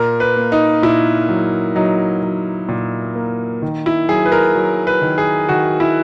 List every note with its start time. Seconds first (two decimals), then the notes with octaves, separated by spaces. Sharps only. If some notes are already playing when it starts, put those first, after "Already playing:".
Already playing: A#2 A#4
0.20 B4
0.36 A#3
0.52 D#4
0.82 A#2 E4
1.29 F#3
1.76 F#3 D#4
2.22 F#3
2.69 A#2
3.16 A#3
3.62 D#3
3.86 E4
4.09 F#3 G#4
4.26 B4
4.32 A#4
4.55 F#3
4.87 B4
5.02 D#3
5.18 G#4
5.49 D#3 F#4
5.80 E4